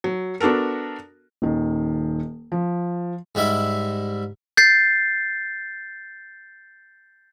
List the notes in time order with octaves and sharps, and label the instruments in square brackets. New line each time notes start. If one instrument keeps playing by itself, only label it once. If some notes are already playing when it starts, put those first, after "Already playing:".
[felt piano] F#3
B3 D4 F#4 A4 A#4
D#1 D#3
F3
[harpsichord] G#2 G3 E4 E5
[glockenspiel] G6 A6 C7